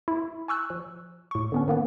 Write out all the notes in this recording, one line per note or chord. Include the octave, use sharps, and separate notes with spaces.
E4
G#5 C#6 E6 F#6
F3
A2 C#6
D3 B3 C#4
D#3 A#3 B3